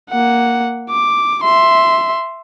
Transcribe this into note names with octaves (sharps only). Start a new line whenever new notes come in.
A#3 F#5
D6
E5 C6